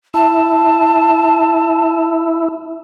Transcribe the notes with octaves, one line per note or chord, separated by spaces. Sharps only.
E4 A5